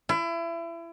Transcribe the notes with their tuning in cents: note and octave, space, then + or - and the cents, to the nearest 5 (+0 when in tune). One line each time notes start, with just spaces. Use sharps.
E4 +30